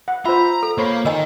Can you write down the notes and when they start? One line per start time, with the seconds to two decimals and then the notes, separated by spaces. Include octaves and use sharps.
0.08 F#5
0.26 F4 C5 E5 A#5
0.63 A4
0.78 A#3 C5 C#5 F5 B5
1.05 D#3 A#4 D#5 G#5